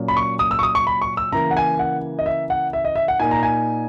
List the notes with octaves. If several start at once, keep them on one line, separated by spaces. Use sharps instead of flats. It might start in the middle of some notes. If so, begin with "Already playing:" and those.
Already playing: A#2 F#3 C#4
B5
C#6
D#6
E6
C#6
D#6
C#6
B5
C#6
E6
C#3 E3 A#3 A#5
F#5
G#5
F#5
D#5
E5
F#5
E5
D#5
E5
F#5
A#2 A#3 D#4 G#5
A#5
G#5